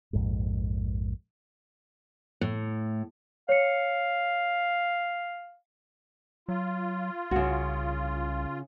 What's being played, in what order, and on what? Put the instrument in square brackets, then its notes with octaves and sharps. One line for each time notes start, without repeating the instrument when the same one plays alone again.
[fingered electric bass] A#1 F2 G#2
[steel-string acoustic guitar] A2
[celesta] C#5 C#7 [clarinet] F5
[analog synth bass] F#3 [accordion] F4
[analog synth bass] C2 [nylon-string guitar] C#3 F#4